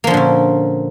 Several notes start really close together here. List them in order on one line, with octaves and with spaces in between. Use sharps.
A#3 F3 D3 A#2 C#4